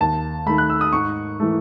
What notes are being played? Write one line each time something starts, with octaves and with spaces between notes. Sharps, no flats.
D#2 A5
D#3 A3 B5
F#6
E6
D#6
G#2 C#6
E3 A3